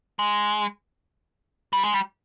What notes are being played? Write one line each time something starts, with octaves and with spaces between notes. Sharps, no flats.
G#3
G3
G#3
G3